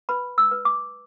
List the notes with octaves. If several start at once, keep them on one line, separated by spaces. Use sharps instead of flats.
B4 B5
E6
B4
D6